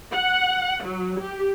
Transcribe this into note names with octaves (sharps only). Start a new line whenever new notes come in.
F#5
F#3
G4